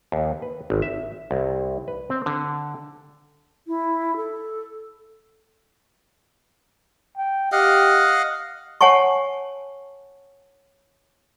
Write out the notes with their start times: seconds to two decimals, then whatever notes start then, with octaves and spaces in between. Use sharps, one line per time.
0.12 D#2
0.42 B4
0.70 G#1
0.82 E5
1.31 C2
1.88 B4
2.10 C4
2.26 D3
3.67 E4
4.16 A4
7.18 G5
7.52 G4 D#5 F5 F#5
8.81 C#5 F#5 G#5 A5 C#6